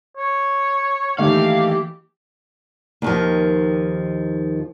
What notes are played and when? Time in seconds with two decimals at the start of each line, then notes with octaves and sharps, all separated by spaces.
0.17 C#5
1.19 D#3 E3 A3 A#3 G4 F5
3.02 D#2 D#3 F3